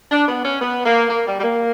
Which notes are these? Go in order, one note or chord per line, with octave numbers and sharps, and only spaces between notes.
D4
B3
C#4
B3
A#3
A#3
G3
G3
A#3